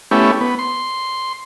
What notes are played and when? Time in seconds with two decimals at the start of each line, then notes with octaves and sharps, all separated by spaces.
0.11 A3 B3 C#4 E4 G4
0.41 B3
0.59 C6